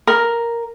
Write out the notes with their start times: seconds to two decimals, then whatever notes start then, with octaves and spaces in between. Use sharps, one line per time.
0.07 A#4